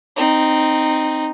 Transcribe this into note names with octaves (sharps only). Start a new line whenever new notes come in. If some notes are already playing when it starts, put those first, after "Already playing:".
C4 D#4